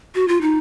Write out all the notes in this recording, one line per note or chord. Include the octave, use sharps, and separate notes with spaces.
F#4
F4
D#4